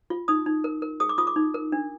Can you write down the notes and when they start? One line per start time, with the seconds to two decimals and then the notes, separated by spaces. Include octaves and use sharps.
0.10 F4
0.28 D#4 D#6
0.46 D#4
0.64 A#4
0.82 A#4
1.00 G#4 D#6
1.09 D6
1.18 F4 D#6
1.27 D6
1.36 D#4
1.54 A#4
1.72 D4